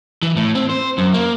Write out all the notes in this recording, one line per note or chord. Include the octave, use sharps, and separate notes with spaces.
E3
A2
C4
C5
F#2
A#3